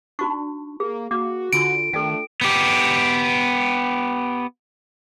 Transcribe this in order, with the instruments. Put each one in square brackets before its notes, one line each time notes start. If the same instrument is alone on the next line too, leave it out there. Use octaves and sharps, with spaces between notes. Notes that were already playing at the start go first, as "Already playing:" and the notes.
[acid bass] D4 [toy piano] D#4 F#4 C#6
[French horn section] A#3 [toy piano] G#4
[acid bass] A#3 [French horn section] F#4 [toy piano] D6
[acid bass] D3 [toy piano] D4 F4 C6 [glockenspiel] D7
[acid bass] D#3 [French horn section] A3 D4 [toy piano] A4 G5
[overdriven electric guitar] B3 G4